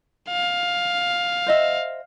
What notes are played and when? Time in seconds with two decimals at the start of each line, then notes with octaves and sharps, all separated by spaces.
0.30 F5
1.46 C5 D#5 E5